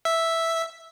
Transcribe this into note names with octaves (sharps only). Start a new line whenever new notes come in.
E5